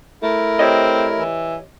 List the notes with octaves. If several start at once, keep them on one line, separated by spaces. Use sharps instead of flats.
A3 E4 A#4
C4 G4 C#5 D#5
E3